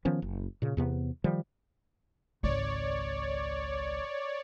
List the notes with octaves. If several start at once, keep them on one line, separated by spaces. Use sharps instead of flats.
D#3 F3 B3 C#4
F#1
A#2 C#3
E2 C3 B3
D#3 F3 G3
G#1 C#2 C#5 D5